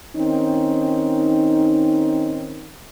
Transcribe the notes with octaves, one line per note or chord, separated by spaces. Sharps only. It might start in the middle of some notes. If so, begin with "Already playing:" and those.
D#3 C4 C#4 D#4